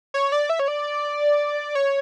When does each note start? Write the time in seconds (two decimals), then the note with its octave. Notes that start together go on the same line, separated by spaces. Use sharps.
0.14 C#5
0.32 D5
0.49 E5
0.59 C#5
0.68 D5
1.75 C#5